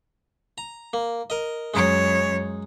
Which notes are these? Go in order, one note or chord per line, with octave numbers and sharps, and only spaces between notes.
A#5
A#3
A#4 D#5
F#2 G#3 D#4 C#5